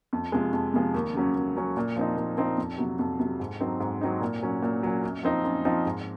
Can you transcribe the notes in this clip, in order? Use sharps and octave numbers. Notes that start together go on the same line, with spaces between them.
F2
C3 F3 G#3
F2
C3 F3 G#3
D#2
C#3 F#3 C#4
D#2
C#3 F#3 C#4
A#2
F3 C4 D#4
A#2
F3 C4 D#4
F2
C3 F#3
F2
C3 F#3
G#2
F#3 C4 D#4
G#2
F#3 C4 D#4
A#2
F#3 C#4
A#2
F#3 C#4
F#2
F3 C4 D#4
F#2
F3 C4 D#4
G#2